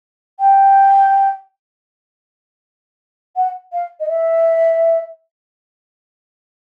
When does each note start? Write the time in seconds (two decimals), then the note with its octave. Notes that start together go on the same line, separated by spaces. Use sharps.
0.40 G5
3.35 F#5
3.72 F5
4.00 D#5
4.08 E5